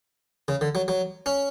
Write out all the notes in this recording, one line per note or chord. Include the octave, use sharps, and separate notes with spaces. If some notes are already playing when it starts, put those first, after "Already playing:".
C#3
D3
F#3
F#3
C#4